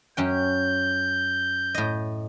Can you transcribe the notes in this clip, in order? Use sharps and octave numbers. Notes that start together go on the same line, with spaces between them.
F#2 C#4 G5 G6
A2 D#5